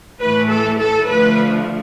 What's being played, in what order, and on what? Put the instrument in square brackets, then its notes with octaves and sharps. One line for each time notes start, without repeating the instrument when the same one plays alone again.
[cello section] A2 E3 A3 B4
A4
A4
D3 F3 A3 B4